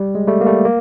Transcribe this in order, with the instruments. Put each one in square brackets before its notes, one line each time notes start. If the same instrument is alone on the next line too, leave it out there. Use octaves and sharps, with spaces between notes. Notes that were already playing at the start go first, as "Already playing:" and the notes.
Already playing: [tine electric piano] G3
G#3
G3 A3
A#3
G3 A3
A#3